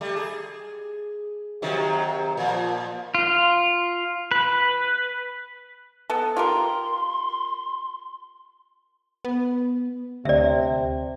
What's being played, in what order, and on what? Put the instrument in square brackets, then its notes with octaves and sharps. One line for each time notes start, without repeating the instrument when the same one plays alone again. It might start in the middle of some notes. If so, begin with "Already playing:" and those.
[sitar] G3 A3
G#4
C3 D#3 F#3
A#2 F3
[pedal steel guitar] F4
B4
[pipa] B3 A4
[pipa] F4 G4 A#4 [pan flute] C6
[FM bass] B3
[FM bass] D2 [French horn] C3 [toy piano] D5 E5